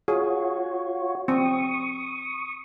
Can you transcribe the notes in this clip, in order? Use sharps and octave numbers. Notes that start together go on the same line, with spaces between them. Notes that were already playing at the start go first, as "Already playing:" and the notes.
F4 F#4 G#4 C#5
C4 C#6 D#6